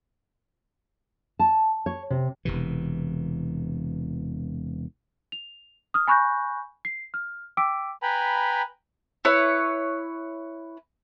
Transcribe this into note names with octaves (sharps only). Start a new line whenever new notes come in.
A5
C#5
C3
E1 C3 E3
F7
D#6 F6
G#5 B5 C#6 F#6 G6 A#6
C7
F6
G5 D6 E6 B6 D7
B4 G5 G#5 A#5 B5
E4 B4 C#5